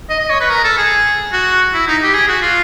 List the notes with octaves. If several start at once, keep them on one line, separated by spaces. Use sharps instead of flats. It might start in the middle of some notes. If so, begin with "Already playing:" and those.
D#5
D#5
C#5
B4
A#4
A4
G#4
F#4
E4
D#4
G4
G#4
F#4
F4